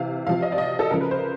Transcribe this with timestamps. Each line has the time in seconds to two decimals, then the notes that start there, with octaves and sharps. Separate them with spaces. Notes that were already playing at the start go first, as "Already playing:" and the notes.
Already playing: C3 E3 F5
0.27 C3 F3 F5
0.42 D#5
0.52 D5
0.58 D#5
0.79 A4
0.90 C#3 F3 A#4
1.01 B4
1.11 C5